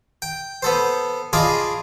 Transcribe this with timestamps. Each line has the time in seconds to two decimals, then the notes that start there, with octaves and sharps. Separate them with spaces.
0.22 G5
0.62 B3 A4 C5
1.33 F4 G#4 D5 D#5 A5 B5